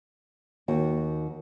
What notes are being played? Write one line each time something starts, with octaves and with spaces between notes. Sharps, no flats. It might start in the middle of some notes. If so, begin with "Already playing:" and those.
D#2 F#4